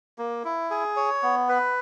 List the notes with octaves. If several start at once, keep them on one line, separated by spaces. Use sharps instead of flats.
A#3
E4
G#4
C#5
B3
B4